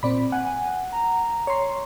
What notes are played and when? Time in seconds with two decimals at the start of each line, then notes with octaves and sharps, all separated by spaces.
0.03 A#2 C4 D5 B5
0.32 F#5 G#5
0.92 A#5
1.47 C#5 C6